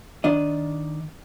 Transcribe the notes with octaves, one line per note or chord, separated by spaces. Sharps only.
D#3 D4 D#5